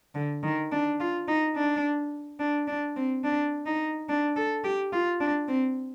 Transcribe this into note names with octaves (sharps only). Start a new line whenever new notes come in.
D3
D#3
D4
F4
D#4
D4
D4
D4
C4
D4
D#4
D4
A4
G4
F4
D4
C4